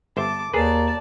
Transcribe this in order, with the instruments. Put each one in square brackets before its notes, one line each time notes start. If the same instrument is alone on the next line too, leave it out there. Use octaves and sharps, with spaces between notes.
[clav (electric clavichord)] G1 C5 E5 [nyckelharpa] A5 D6
[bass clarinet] D#2 [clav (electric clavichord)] G#4 B4 [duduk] A#4 [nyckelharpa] D5 A5